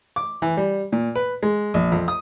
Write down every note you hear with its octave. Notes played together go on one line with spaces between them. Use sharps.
D6
E3
G3
A#2
B4
G#3
A#1
F2
D#6